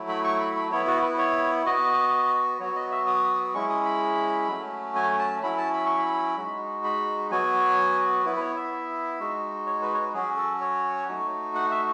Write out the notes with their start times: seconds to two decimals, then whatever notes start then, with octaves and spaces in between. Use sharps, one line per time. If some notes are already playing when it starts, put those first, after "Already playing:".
Already playing: F#3 A3 E4
0.08 B5
0.24 C#6
0.40 B5
0.56 B5
0.71 B3 E4 C#5
0.87 F#4
1.02 B4
1.18 C#5
1.66 B3 F#4 D#5
2.60 F#3 B3 F#4 C#5
2.76 D#5
2.91 E5
3.07 D#6
3.54 G#3 C#4 E4 C#6
3.70 D#6
3.85 B5
4.48 F#3 A3 C#4
4.95 G#5
5.19 A5
5.42 F#3 C#4 E4 B5
5.58 A5
5.74 B5
5.86 C#6
5.98 B5
6.37 G#3 D#4 F#4
6.84 B5
7.31 F#3 B3 F#4 G#5
8.25 B3 E4 B4
8.36 B4
8.41 C#5
8.57 E5
9.20 G#3 D#4 F#4
9.66 C#5
9.82 B4
9.94 C#5
9.98 B4
10.14 F#3 C#4 F#4 G#4
10.37 A4
10.61 C#5
11.08 A3 D#4 F#4
11.55 F#5
11.71 E5